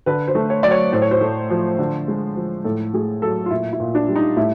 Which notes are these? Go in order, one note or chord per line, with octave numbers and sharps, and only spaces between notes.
D3 B4
C5
A3
C#5
F#3 D5
C#5
A2 C5
C#5
C5
A3
F3
D3
G#3
F3
A2 A4
A3 G#4
F#3 A4
F4
A#2 E4
E4
A#2
D4
G3
D#4
A2 E4